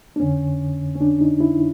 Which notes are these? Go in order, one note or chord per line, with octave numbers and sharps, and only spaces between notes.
D4
F2 D3 C#4
C#4
D4
D#4
E4